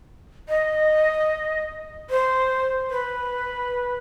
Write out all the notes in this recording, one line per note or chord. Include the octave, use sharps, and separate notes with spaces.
D#5
C5
B4